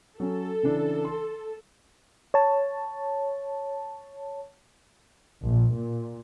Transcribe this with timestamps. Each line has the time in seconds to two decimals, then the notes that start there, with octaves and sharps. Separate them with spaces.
0.20 F#3 C#4 A4
0.63 C#3 E3 D4
1.05 C6
2.34 C#5 A5
5.43 A#1
5.75 A#2